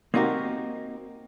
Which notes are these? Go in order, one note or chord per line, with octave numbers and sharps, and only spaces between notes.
A#3 C4 D#4 F#4 G4 A#4